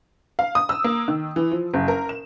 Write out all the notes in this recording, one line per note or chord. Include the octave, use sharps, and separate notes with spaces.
F5
D#6
E6
A#3
D#3
E3
F3
F#1
A#4
E7